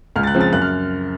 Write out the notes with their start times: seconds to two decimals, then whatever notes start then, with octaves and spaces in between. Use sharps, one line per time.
0.16 C#2 F6
0.23 A6
0.27 F#6
0.35 C#3 F3 C4
0.41 A6
0.53 F#2 F#6
0.62 F6